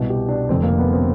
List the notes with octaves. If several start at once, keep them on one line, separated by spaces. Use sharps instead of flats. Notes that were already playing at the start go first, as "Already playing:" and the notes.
Already playing: C2 B2
G4
D4
F1 F2 D3 C4
A#3
B3
C4